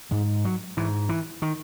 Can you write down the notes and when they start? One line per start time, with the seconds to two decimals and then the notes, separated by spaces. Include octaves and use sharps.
0.11 G#2 G#3
0.45 F#3
0.77 G#2 E3
1.09 E3
1.42 D#3